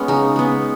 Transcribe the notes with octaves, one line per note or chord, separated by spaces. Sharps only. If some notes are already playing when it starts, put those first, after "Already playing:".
Already playing: G#3 B3 C#4
C#3 D#4
G#3 B3